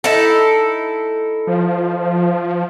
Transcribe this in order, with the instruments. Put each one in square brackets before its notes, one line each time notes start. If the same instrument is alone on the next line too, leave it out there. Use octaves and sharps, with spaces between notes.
[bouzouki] D#4 E4 A4
[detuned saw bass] F3